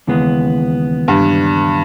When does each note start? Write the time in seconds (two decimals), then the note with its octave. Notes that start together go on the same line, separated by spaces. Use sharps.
0.07 D#2 C#3 E3 G#3 B3
1.08 G2